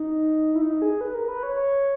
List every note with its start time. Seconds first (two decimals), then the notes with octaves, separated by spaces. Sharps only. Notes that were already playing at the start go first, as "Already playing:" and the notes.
Already playing: D#4
0.55 E4
0.62 D#4
0.82 G#4
1.01 B4
1.14 A#4
1.28 B4
1.43 C#5
1.56 C#5